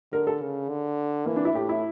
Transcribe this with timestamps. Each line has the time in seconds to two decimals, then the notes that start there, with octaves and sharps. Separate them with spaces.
0.12 D3 A#4
0.27 A4
0.42 C#3
0.69 D3
1.26 E3 A#3
1.36 D4
1.45 E4
1.54 A2 G4
1.69 E4